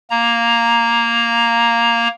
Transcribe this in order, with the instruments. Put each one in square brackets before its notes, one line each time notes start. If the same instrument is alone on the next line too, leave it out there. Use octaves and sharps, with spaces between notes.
[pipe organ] A#3 A#5